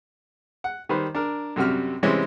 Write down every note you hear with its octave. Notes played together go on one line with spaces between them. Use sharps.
F#5
D#3 G3 B4 C5
D4 A#4
F#2 C3 G3 F#4 F6
C3 E3 G3 G#3 C4 C#4